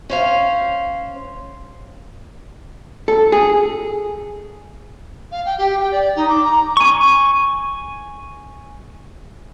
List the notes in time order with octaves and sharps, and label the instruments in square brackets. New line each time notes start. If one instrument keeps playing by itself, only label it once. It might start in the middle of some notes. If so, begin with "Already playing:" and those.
[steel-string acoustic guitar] C#4 C5 F5
[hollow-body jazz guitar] A4
G#4
[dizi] F5
G5
G4
G5
D5
D#4
D6
A#5
[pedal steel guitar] G#5 C#6